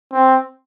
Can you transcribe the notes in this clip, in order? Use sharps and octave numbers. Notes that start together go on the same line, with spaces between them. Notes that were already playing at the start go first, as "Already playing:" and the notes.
C4